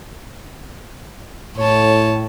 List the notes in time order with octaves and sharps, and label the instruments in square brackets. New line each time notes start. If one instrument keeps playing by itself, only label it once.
[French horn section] A2 [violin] C#5 A5